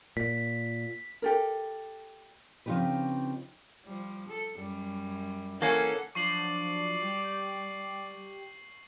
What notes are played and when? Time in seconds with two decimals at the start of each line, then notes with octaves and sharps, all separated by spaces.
0.17 A#2 B6
1.22 G4 A4 A#4
2.66 C#3 F3 C4 D#4 G4 B4
3.85 F3 G3
4.29 A4
4.58 F#2 G3
5.61 E3 A#3 C#4 A4 F#5
6.15 F3 F#3 D4 D5 C#6 C7 F#7
7.01 G3 G4